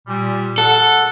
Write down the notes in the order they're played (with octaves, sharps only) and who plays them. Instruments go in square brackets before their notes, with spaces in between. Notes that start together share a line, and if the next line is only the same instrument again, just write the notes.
[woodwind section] A#2 G3
[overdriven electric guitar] A4 [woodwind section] F#5